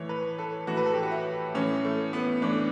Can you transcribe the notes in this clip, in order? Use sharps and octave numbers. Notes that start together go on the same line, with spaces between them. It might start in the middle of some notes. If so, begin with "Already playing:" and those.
Already playing: A2 E3 C#5
B4
A4
A2 E3 F#4
B4
A4
G4
F#4
E4
A2 E3 C#4
A3
B3
A2 E3 D4